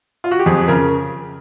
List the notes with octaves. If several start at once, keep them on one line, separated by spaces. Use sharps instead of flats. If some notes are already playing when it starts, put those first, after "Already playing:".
F4
F#4
G4
F2 G#4
C#3 A#4